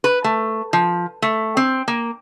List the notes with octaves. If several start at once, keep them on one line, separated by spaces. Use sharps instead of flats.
B4
A3
F3
A3
C4
A#3